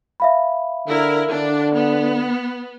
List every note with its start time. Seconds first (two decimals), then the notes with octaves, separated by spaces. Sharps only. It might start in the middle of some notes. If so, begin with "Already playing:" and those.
0.20 E5 F5 B5
0.88 D3 E4 A#4
1.30 D3 D4
1.75 B3